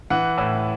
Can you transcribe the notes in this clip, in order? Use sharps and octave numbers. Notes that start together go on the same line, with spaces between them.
E3 F#5
A2